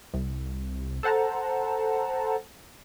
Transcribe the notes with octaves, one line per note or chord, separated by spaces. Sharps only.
C2
A4 C5 F#5 A5 A#5